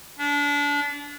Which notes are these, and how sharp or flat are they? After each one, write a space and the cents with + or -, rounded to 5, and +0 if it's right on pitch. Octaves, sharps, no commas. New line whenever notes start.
D4 -30